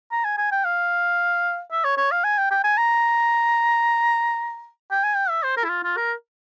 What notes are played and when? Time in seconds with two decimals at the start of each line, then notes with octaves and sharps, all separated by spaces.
0.12 A#5
0.25 G#5
0.38 G#5
0.52 G5
0.65 F5
1.72 E5
1.85 C#5
1.97 C#5
2.12 F5
2.24 G#5
2.38 G5
2.51 G5
2.64 G#5
2.78 A#5
4.91 G5
5.04 G#5
5.16 G5
5.30 E5
5.43 C5
5.57 A#4
5.64 E4
5.69 F4
5.84 F4
5.97 A#4